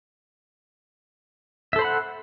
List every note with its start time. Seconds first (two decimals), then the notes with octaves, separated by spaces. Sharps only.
1.73 E5
1.76 A4
1.79 C5
1.82 B5
1.84 F#5